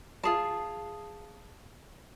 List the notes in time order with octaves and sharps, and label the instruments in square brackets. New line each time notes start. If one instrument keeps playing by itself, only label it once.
[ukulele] F4 G#4 A5